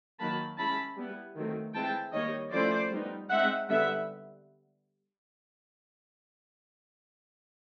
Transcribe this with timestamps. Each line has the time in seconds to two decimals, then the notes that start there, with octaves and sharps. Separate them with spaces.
0.19 D#3 F#3 A#3 A5 B5
0.57 G#3 C#4 E4 A5 B5
0.96 G3 B3 E4
1.35 D#3 F#3 A3 C4
1.74 E3 G#3 C4 E4 G5 A5
2.13 D#3 G3 A#3 C#5 D#5
2.51 F3 A3 C#4 E4 C5 D5
2.92 G3 B3 D#4
3.29 G#3 C4 D#4 E5 F#5
3.68 D3 G3 B3 E5 F#5